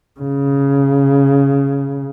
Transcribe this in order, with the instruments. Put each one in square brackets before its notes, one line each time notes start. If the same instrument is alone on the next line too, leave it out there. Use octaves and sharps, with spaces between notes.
[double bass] C#3